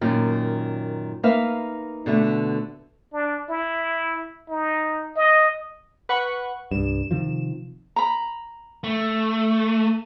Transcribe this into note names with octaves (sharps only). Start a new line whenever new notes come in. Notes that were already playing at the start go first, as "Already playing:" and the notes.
F#2 A#2 D#3 A#4
A#3 D#4 B4 E5 F5
B2 D3 A3
D4
E4
D#4
D#5
B4 F#5 C#6
C2 G2 E7
C3 D#3 F3
A#5 B5
A3